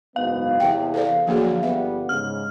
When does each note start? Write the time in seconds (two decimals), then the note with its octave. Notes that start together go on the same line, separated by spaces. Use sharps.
0.16 F#1 G#2 B3 F5
0.60 E2 C3 G5
0.94 A4 C5 D5
1.27 F#2 D3 F3 A#3 G#4
1.63 G1 G3 B3 E5
2.09 G#2 C#3 F6